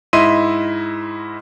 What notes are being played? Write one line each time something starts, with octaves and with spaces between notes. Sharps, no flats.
G#2 E4 D#5 E5 C6 D#7